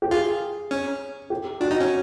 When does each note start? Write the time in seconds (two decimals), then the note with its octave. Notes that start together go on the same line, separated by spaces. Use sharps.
0.02 G4
0.11 F4 G#4
0.71 C#4
1.30 G4
1.61 D4 F#4
1.71 D#4
1.80 C#4